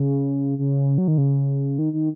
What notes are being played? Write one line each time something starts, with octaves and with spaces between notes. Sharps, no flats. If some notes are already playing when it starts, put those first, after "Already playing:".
Already playing: C#3
C#3
F#3
D#3
C#3
D#3
D#3